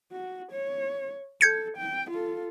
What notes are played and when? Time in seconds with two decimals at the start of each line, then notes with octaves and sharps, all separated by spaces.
0.12 F#4
0.51 C#5
1.41 A4 G6 G#6 C#7
1.77 G5
2.10 F4 A4